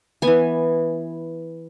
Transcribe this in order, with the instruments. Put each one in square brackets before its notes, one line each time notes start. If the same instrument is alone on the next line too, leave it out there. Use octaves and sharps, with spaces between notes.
[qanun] E3 B3 G#5